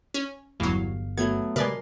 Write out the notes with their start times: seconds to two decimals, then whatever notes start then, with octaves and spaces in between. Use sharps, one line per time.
0.14 C#4
0.60 D1 G1 E2 F#3 F5
1.18 F#3 A3 B3 G#6
1.56 C3 G#3 A#4 B4 D5 G#5 C6